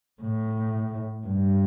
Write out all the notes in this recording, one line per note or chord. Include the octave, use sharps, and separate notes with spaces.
A2
G2